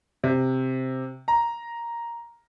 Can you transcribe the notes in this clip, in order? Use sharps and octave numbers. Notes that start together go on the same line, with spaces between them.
C3
A#5